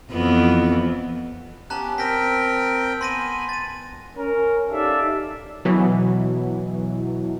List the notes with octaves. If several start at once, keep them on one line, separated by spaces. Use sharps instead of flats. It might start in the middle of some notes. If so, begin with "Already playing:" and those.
F2 E3 B3
B3 C#4 G4 A5 A#5 F#6
C4 A#4 G5 A#6 B6
B3 G#5 B5 C6 A#6 D#7
A6 D#7
C#4 A#4
D#4 G4 A4 D5 E5 F5
B2 E3 F#3